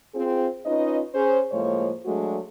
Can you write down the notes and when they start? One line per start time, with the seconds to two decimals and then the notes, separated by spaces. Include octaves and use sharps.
0.14 C4 F4 G#4
0.66 C#4 D#4 F4 B4 D#5
1.14 C#4 G#4 C5
1.51 A2 F3 G#3 A#3 C5 C#5
2.05 F#3 G#3 A3 D4 F#4